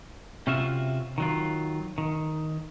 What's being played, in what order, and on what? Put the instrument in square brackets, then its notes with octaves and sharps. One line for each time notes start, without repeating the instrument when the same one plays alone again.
[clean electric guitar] C3 C#4 F4 F#4 E5
D#3 F#3 F4
D#3